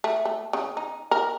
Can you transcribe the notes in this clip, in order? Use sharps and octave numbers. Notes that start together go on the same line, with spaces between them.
A3
A3
C#3
D#4
A#4